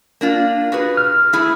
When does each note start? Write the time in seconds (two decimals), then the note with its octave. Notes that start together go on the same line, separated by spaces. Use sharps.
0.21 A#3 D4 F4
0.72 F#4 G#4 B4
0.97 F6
1.33 A3 E4 G#4